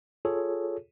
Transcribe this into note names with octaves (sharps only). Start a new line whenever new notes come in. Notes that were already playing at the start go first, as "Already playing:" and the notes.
F4 G#4 A4 C#5